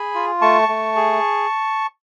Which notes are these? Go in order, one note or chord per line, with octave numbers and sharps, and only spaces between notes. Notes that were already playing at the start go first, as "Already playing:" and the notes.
Already playing: G#4 G#5 B5
F4
A3 A5 C#6
A3
G#4